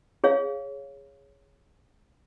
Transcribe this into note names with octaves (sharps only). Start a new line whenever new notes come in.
G#4 C#5 F5